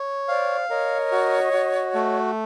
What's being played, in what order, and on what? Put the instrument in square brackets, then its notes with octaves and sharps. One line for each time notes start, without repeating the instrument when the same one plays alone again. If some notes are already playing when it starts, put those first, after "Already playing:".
Already playing: [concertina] C#5
[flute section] C5 D5 [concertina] F5
[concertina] A#4 [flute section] C#5 D#5
[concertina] F#4
F#4
A3